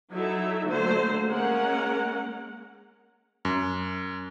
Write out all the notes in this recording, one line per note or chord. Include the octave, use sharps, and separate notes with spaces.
F#3 D#4 E4 A4 E5
D3 F#3 A3 A#3 C5
G#3 A#3 C#4 A#4 F#5
F#2